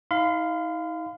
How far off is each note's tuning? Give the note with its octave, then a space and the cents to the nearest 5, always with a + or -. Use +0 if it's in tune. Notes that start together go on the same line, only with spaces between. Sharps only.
D#4 +40 F5 +0 C6 -45